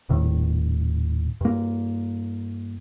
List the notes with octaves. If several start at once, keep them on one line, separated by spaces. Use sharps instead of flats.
D#1 A2 D#3
G2 A#3